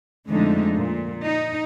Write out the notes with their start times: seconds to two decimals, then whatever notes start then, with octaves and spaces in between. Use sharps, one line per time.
0.29 F2 D3 G#3 A3 D#4
0.76 A#2
1.24 D#4